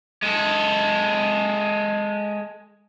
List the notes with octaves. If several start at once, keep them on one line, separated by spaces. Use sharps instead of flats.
G#3 A4